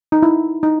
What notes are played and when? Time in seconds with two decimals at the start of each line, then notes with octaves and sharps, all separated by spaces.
0.12 D#4
0.23 E4
0.63 D#4